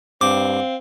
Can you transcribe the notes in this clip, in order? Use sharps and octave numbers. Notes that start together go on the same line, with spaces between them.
G2 C4 F5 D6